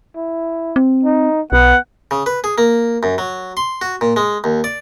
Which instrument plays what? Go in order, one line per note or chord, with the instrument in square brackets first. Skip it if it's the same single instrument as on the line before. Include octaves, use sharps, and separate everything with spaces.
[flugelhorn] E4
[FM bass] C4
[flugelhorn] D#4
[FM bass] B1 [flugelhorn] B3 [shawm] F#5
[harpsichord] C#3
B4
G#4
A#3
F#2
F#3
C6
F#4
A#2
G#3
D#2
D5